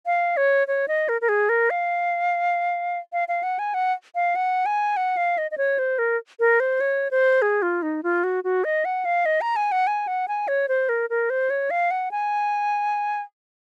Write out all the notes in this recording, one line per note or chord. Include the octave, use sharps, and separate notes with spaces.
F5
C#5
C#5
D#5
A#4
A#4
G#4
A#4
F5
F5
F5
F#5
G#5
F#5
F5
F#5
G#5
F#5
F5
D#5
D#5
C#5
C5
A#4
A#4
C5
C#5
C5
G#4
F4
D#4
F4
F#4
F#4
D#5
F#5
F5
D#5
A#5
G#5
F#5
G#5
F#5
G#5
C#5
C5
A#4
A#4
C5
C#5
F5
F#5
G#5